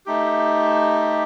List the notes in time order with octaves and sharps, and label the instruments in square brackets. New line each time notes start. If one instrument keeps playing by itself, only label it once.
[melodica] A3 D#4 G4